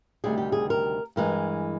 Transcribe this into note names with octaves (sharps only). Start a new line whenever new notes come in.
D2 C3 D#3 G3 G#4
G4
G#4
A#4
G2 E3 G#3 A#4